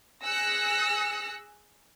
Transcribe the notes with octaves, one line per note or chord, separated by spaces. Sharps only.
G#4 E6 F#6 A#6 C#7